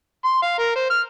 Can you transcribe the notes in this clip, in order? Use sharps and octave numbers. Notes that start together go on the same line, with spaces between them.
C6
F5
A#4
C5
F6